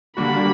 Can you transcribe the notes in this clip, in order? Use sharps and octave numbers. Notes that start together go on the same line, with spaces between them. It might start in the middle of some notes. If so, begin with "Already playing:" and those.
D3 G3 A#3 D4 F#4 B5